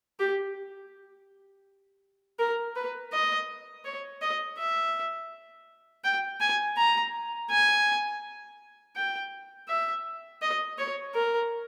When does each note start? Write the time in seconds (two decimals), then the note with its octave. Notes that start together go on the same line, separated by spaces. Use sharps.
0.20 G4
2.39 A#4
2.76 B4
3.12 D#5
3.85 C#5
4.22 D#5
4.58 E5
6.04 G5
6.40 G#5
6.77 A#5
7.50 G#5
8.96 G5
9.68 E5
10.42 D#5
10.78 C#5
11.15 A#4